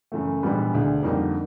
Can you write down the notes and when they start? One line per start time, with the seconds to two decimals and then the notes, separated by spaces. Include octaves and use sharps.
0.12 F#2 C#3 E3 A3
0.43 A#1 G#2 E3 G3 B3
0.73 E1 D2 D3
1.03 F2 D3 G3 A#3 D#4